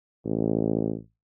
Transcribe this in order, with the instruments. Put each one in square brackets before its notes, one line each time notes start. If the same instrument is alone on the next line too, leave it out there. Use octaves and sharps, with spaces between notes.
[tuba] A1